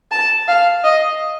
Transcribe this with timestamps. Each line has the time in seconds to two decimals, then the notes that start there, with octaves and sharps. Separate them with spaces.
0.11 A5
0.48 F5
0.84 D#5